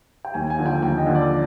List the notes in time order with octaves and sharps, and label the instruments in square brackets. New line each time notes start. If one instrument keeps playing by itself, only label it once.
[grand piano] G5
D#2 G#5
G#5
D3 F3
G5
D#2 G5
D#5
D3 F3
D5